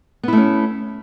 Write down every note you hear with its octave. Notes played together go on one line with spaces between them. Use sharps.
A3 B3 C#4 E4